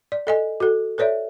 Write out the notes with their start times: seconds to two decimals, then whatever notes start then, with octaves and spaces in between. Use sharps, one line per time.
0.12 D5
0.27 A4 D#5 G#5
0.60 F#4 A4
0.98 A4 B4 C#5 D5 E5